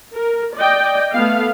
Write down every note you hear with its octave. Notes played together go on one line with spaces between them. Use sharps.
A#4
D5 D#5 G5
A3 B3 F5